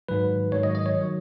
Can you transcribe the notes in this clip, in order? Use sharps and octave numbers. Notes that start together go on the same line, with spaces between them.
G#2 D#3 F#3 B4
G#2 D#3 F#3 C#5
D#5
D#5
C#5
D#3 F#3